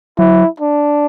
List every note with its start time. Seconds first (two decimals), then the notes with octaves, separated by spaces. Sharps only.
0.19 F#3 E4
0.60 D4